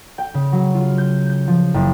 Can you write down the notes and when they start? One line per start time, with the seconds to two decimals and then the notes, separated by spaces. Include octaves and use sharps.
0.18 G5
0.34 C#3
0.52 F#3
0.74 F4
0.98 G6
1.30 G6
1.48 F3
1.74 F#1